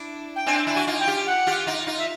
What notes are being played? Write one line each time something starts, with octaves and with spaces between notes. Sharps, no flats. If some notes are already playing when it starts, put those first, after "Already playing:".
Already playing: D4 E4
G5
C4 D4 G#5
D4 E4
F#4 G#5
D#4 F4
G5
F4 G4
F#5
F4 G4
D#4 F4
D#4 F4
E5